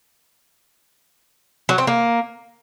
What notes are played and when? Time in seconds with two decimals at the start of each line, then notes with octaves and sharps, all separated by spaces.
1.69 F#3
1.78 C4
1.87 A#3